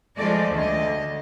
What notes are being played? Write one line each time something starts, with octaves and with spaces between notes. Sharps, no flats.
F3 G#3 A3 D5 D#5
D2 D3 D#5